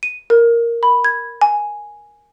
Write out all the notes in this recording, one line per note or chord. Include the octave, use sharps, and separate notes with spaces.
D#7
A#4
B5
G#6
G#5